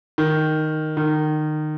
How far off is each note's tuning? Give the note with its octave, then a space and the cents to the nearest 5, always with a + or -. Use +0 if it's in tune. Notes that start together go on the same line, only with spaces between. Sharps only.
D#3 -5
D#3 -25